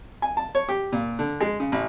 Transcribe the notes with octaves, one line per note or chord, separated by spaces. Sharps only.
G#5
A5
C#5
G4
A#2
D3
G#3
C#3
A1